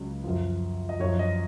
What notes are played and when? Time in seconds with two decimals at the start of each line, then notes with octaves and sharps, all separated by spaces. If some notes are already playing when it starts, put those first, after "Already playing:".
Already playing: C#2 C#3 F#3
0.24 F#2 F3
0.89 D#5
1.00 F#2 F3 C#5
1.19 D#5